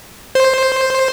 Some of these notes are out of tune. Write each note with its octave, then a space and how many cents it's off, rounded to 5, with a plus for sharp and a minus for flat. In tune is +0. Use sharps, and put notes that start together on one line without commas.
C5 +5